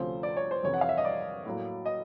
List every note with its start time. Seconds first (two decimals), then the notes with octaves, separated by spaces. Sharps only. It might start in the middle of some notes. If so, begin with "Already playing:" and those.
Already playing: D2 C3 F3 A3 C#4 C5
0.23 D5
0.37 C#5
0.51 C5
0.63 F2 C3 E3 C#5
0.74 F#5
0.81 F5
0.89 E5
0.98 D#5
1.05 D5
1.46 A2 F#3 A#3
1.86 D#5